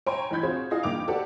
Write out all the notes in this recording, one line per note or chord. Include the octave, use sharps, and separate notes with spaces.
C#5 G5 G#5 A#5 C6
E3 D#4 B5 G6 G#6
C4 F4 F#4 G#4 C5 C#5
E4 F4 G#4 D#5 F5
E2 A#3 D#4 G5 D6 F7
F#4 G4 A4 B4 D5 F#5